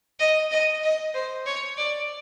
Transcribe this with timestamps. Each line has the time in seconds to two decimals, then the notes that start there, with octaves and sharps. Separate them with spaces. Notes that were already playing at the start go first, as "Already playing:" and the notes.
0.20 D#5
0.51 D#5
0.83 D#5
1.14 C5
1.46 C#5
1.77 D5